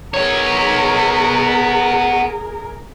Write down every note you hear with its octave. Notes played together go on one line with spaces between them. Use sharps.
B3 G#4 A#4 C#5